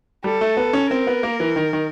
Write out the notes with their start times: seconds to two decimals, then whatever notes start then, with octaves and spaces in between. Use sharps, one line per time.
0.24 G3 A4
0.41 A3
0.57 B3
0.73 C#4
0.90 C4 A#4
1.07 B3
1.23 A#3
1.40 E3
1.56 D#3
1.73 D#3